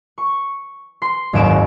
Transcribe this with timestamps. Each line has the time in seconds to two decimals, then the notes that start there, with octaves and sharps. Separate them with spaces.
0.18 C#6
1.02 C6 C7
1.33 F#1 D#2 G#2 C#5 D7 E7